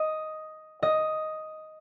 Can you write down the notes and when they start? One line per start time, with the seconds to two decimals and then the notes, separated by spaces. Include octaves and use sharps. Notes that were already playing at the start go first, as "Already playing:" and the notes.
Already playing: D#5
0.83 D#5